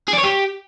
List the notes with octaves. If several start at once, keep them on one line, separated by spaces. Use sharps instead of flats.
G#4
D5
C#5
G4